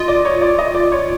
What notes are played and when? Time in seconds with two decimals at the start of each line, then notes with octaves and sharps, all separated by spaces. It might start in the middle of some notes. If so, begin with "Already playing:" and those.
Already playing: F4 D#5
0.08 D5
0.25 C#5
0.42 D5
0.59 D#5
0.75 D5
0.92 C#5